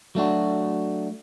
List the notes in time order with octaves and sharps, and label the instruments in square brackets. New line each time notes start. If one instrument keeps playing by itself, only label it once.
[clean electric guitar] F#3 A3 D4 F#4